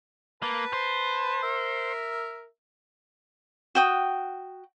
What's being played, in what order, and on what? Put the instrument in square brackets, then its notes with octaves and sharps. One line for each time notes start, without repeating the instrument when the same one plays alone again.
[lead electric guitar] A#3 [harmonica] B4 A5
[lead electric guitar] C5
[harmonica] A#4 E5
[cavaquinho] F#4 G5 D#6